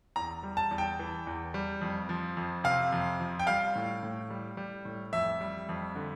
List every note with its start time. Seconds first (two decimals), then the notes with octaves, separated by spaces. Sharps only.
0.16 E2 A#5
0.43 G3
0.57 A5
0.71 E2
0.78 G5
0.99 E3
1.27 E2
1.54 G3
1.81 F2
2.09 F3
2.37 F2
2.64 C3 F5
2.92 F2
3.20 F3
3.39 G5
3.47 G3 F5
3.75 A2
4.03 A2
4.30 G3
4.57 G3
4.85 A2
5.13 F2 E5
5.41 G3
5.69 F2
5.95 D3